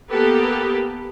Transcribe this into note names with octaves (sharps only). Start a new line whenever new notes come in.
A#3 B3 G4 A4 B4